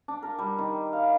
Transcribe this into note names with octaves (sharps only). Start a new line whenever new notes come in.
D4
A#4
G3
D#3
F5